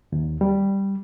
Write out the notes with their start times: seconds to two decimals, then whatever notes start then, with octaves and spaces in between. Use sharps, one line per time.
0.12 D#2
0.41 G3